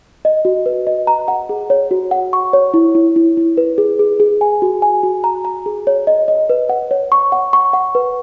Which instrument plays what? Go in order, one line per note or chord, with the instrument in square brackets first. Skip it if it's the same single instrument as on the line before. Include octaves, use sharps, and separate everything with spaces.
[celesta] D#5
F#4
B4
D#5
A#5
F#5
G#4
C#5
F#4
F#5
C#6
C#5
E4
E4
E4
E4
B4
G#4
G#4
G#4
G#5
F#4
G#5
F#4
A#5
A#5
G#4
C#5
D#5
D#5
B4
F#5
C#5
C#6
F#5
C#6
F#5
B4